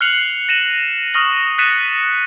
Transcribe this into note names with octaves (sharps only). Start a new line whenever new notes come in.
F6 F#6 C7 C#7 F7 F#7
A#6 D#7 E7 F#7
C#6 D#6 F6 A#6 F#7
F#6 A6 B6 C#7 D#7 E7